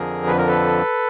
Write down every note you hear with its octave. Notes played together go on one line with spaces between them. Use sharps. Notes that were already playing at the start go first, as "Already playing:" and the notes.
Already playing: F2 D3 F3 G#4 A#4
B4
A#4
A4 B4